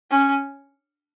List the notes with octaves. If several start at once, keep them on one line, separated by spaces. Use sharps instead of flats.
C#4